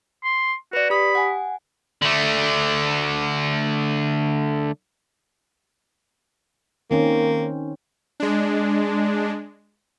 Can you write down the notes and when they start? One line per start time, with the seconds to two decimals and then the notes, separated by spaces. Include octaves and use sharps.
0.24 C6
0.73 F#4 B4 D5
0.90 G4 B5 D#6
1.15 F#5 G#5
2.02 D3 A3
6.91 D#3 A#3 C4 C#4
8.20 G#3 D4